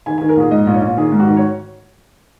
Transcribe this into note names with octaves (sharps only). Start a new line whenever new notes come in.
D#3 G#5
D#3 G#5
A#4
A#1 G#4
G#2 D#5
A#1
C#5
A#1
D#3 G#4
G#2
F#4
D#3
C#5